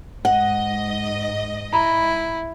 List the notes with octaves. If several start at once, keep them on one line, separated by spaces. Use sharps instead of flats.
G#2 D#5 F#5
E4 A#5 B5